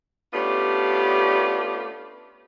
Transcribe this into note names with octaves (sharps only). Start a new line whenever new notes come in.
A3 B3 C#4 D4 F4 G4